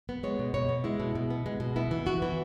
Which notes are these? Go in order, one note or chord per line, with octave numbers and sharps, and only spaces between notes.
B3
G#3 C#5
B2
B2 C#5
B3
G#3 E4
B2
B2
B3
G#3
B2
B3 E4
E3
B3 F#4
E3